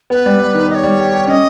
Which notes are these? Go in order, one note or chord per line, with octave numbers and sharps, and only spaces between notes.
B3 B4
G3
G3
D#3
G4 D#5
C#5
G3
G4
G4
C#4 D#5